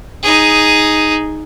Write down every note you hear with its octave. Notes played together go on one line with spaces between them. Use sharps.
D#4 G#4